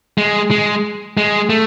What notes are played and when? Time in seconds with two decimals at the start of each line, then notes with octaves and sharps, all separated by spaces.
0.18 G#3
0.51 G#3
1.17 G#3
1.50 A3